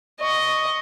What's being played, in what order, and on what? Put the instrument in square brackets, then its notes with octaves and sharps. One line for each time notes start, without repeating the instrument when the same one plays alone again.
[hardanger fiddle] D#5 [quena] C#6